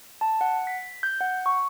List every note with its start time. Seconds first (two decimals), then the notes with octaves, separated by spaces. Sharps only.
0.21 A5
0.41 F#5
0.67 B6
1.03 G6
1.21 F#5
1.46 C#6